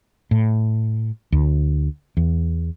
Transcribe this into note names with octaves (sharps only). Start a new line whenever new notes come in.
A2
D2
E2